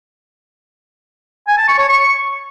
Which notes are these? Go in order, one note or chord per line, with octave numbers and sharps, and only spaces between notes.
G#5
A5
C#6
C#5
C#6